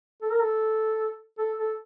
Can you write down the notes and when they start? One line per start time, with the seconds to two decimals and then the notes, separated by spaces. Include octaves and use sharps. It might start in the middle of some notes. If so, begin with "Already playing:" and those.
0.22 A4
0.32 A#4
0.41 A4
1.38 A4
1.58 A4